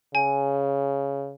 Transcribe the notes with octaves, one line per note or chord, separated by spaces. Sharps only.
C#3 G#5